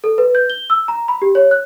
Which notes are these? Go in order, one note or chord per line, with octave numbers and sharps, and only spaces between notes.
A4
B4
G6
G7
E6
A#5
B5
G4
C#5
F#6